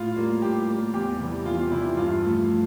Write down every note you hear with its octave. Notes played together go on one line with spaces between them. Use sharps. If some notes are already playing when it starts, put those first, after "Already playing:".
Already playing: A2 F4
G3 A#3
A2 G4
G3 A#3
E2 G4
C3 E3 G3
E2 F4
C3 E3 G3 E4
G2 F4
F3 A3